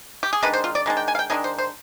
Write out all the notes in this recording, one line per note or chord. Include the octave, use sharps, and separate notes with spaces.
G4
G#4
D#3 G#3 D4 B4
C5
F4
D5
D#3 G#3 D4
G5
G#5
F5
G5
D#3 G#3 D4 G#4
C5
C5